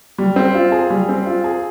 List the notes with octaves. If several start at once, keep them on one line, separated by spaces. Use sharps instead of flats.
G3
C4
F4
G#4
G3
C4
F4
G#4